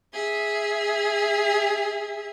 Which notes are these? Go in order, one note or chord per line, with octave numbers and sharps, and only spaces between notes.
G#4 E5